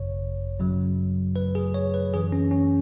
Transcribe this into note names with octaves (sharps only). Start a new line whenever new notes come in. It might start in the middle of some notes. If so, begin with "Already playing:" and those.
Already playing: G#1 F#2 C#3 C#5
F#2 C#3 F#3
B4
G#4
C#5
B4
F#2 E3 G#4
C#4
C#4